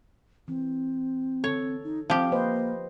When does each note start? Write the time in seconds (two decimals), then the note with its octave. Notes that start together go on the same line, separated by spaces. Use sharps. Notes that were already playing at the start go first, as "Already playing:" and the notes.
0.48 E3 C4
1.44 D3 A4 C#5
1.84 D#4
2.10 F3 C4 G4 F5
2.32 A#3 B4 C5 D#5